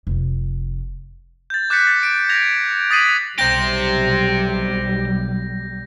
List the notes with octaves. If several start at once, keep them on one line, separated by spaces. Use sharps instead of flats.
F1
G6 A6
D6 F#6 G6 A6 B6 C#7
A6
D7
G#6 A#6 F7
D#6 A6 B6 C7 D#7 F#7
B1 G3 G4 C5 G6 A#6